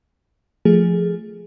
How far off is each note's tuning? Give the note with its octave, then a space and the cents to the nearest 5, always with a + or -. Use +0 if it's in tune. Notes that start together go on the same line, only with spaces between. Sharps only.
F3 +0 A3 +0 G#4 +0